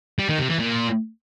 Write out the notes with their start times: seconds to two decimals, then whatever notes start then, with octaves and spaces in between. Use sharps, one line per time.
0.19 G3
0.29 D#3
0.39 C3
0.49 E3
0.59 A#2